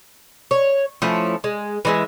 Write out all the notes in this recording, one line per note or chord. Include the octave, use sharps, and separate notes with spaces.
C#5
F3 A3 C#4 E4
G#3
E3 G#3 E5